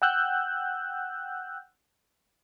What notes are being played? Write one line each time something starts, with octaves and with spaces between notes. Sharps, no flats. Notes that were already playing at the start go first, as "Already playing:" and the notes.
F#5 G5 E6 F#6 G6